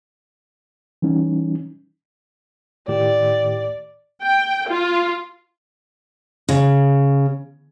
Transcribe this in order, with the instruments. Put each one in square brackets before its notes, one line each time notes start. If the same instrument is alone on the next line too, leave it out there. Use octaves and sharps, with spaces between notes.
[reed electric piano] E3 G3 C#4 D#4
[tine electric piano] A2 D#3 G4 [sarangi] D5
[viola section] G5
F4
[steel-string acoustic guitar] C#3